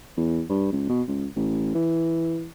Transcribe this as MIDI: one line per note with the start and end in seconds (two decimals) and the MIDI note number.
0.17 0.42 40
0.49 0.70 43
0.72 0.85 37
0.90 1.02 47
1.08 1.27 37
1.36 1.72 33
1.75 2.48 52